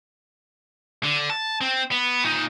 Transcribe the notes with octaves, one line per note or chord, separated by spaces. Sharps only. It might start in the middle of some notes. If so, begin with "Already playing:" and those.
D3
A5
C4
B3
A#2 D#4